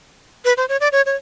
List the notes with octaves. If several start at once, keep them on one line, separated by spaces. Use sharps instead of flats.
B4
C5
C#5
D5
C#5
C#5